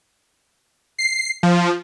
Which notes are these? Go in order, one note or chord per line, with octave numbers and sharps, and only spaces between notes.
C7
F3